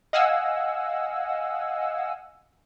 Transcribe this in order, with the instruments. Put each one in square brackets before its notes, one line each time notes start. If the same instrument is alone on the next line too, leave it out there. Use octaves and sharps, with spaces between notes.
[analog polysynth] D#5 F5 F#5 G#5 E6